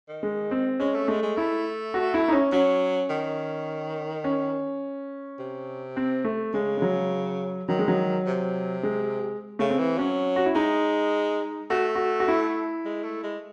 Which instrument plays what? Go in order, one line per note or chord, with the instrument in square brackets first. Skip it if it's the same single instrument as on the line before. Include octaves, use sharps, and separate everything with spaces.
[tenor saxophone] D#3
[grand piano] G#3
C4
[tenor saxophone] G#3 [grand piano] C#4
[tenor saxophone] A3
[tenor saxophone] G#3 [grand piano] A3
[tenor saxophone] G#3
[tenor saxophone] A3 [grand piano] E4
[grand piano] F#4
E4
D#4
C#4
[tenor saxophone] F#3 [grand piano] C#4
[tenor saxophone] D#3
[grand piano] C#4
[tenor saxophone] C3
[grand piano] C4
A3
[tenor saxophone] C#3 [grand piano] G#3
[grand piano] G#3
F#3
[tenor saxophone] D#3 [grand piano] F#3
[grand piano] G#3
F#3
[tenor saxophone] C3
[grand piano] G#3
[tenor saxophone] C#3 [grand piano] A3
[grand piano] C4
[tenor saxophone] E3
[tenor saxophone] F#3 [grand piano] C#4
[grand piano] F#4
E4
[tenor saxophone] G#3 [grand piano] D#4
[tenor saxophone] A3 [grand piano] F#4
[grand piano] F#4
F#4
E4
[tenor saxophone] G#3
A3
G#3